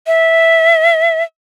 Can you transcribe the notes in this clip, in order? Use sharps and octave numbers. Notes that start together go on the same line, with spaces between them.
E5